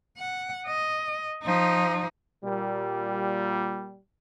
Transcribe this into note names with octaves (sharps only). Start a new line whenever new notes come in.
F#5
D#5
F3 D#4
A#2 G3